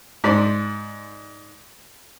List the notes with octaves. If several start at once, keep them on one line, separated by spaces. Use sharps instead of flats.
G#2 C5 D5